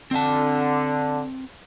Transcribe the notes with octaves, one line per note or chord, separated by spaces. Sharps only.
D3 C4 A5